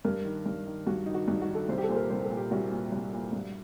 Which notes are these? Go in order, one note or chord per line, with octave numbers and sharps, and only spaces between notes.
G2 A#4
D#3
G2
D#3
G2 F#4
D#3 D#4
F#4
G2 D#4
F#4
D#3
A4
C2 C5
G4
A4
A#2 C5
A#4
C2 C5
A4
A#2
G4
C2 F#4
A#2
C2
A#2
G2